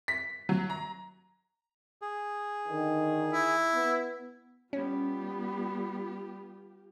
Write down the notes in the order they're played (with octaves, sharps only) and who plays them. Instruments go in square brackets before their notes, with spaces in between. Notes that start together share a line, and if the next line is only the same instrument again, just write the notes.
[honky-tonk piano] B6
F#3
A#5
[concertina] G#4
[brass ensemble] D3 D#3
[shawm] E4
[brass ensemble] B3
[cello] G3 B3 [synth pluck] C#4 [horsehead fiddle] F4 G4